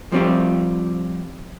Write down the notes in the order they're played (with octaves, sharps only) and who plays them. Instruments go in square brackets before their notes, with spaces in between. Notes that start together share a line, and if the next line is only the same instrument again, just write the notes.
[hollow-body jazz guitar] F3 G3 C4 F4 G4